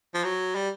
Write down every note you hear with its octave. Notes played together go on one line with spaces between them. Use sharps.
F3
F#3
G3